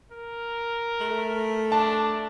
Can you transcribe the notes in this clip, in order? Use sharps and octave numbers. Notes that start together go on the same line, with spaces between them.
A#4
A3
D4 A5